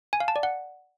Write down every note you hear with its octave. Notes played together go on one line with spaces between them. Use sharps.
G#5
F5
A5
D5
F#5